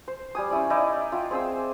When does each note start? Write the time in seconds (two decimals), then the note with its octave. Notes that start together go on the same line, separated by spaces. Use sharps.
0.08 C5
0.35 G3 G#5 D#6
0.50 C#4 E4 D5
0.70 D#4 E4 D5 D#5
1.12 F4 E5 G5
1.31 C4 G#4 C5 E6